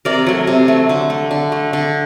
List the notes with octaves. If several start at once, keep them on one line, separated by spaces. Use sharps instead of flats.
C3 A#4 D5
F#3 A3
C3
F#3 A3
D3
A3
D3
A3
D3